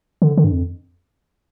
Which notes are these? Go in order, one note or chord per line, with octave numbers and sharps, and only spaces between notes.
D3
D3
G2
F2